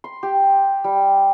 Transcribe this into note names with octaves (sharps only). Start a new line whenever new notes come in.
C6
G4
G3